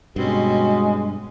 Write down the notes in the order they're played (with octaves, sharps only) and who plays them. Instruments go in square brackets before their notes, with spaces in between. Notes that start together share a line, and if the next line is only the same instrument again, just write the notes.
[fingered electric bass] G2 [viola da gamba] B2 C4 C#4 [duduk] G#3 [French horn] F#4